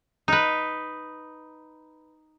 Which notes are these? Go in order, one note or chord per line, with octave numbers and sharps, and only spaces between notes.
D#4 B4